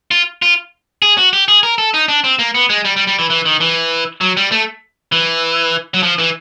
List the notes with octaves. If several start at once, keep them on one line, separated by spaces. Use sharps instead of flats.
F4
F4
G#4
F#4
G4
G#4
A#4
A4
D#4
D4
C4
A#3
B3
G#3
G3
G3
G3
E3
E3
D#3
E3
F#3
G3
A3
E3
F#3
F3
E3